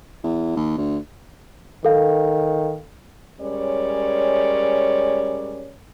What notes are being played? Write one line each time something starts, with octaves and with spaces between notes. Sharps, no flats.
E2
D#2
D2
D#3 A4 F5
G3 G#3 C#4 A#4 C#5 D5